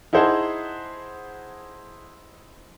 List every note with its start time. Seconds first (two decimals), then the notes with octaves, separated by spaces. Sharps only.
0.13 D#4 E4 G#4 C5 F#5 A5